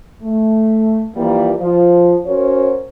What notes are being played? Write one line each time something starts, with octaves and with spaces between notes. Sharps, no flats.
A3
E3 F3 G3 A#3
F3
C#4 F#4 A#4 C5 C#5